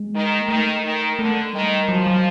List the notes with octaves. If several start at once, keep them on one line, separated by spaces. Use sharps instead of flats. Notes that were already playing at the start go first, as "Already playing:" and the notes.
Already playing: G#3
D#3
A#3
D#3 A3
D#3
D3 A3
D#3 G3
F3 F#3
F#3